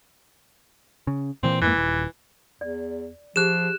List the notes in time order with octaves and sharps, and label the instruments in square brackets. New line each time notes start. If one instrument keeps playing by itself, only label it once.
[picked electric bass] C#3
[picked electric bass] A#2 E3 A#3 [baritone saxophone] C4
[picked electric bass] F2 G#2 A#3 [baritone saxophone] E3
[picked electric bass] D#1
[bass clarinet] E2 [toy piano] D5
[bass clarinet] F3 [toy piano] G4 G#4 [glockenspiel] F#6 E7